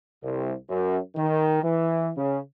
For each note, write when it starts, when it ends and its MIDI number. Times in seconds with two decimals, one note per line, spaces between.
0.24 0.53 36
0.69 0.98 42
1.15 1.60 51
1.64 2.11 52
2.16 2.39 49